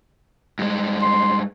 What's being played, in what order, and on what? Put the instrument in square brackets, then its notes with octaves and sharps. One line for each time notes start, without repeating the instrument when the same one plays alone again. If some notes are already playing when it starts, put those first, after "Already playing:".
[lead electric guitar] G2 G#3
[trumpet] C6